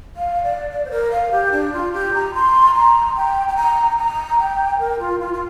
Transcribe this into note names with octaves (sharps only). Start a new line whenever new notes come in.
F5
D5
D5
C5
A#4
F5
G4
D4
F4
G4
A#5
C6
A#5
G5
G5
A#5
A#5
G5
A#4
F4
F4
F4